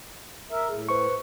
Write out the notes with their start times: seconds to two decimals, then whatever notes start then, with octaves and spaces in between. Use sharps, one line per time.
0.50 A#4 E5
0.69 A2 G#4
0.89 B4 C5 C#6